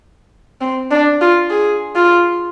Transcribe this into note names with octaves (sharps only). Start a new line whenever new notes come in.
C4
D4
F4
G#4
F4